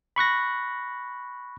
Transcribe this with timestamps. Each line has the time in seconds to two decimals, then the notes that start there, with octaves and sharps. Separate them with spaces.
0.16 B5 C#6 F#6 A#6